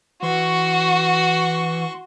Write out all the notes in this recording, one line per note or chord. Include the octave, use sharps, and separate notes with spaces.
E3 F#4 C6 C#6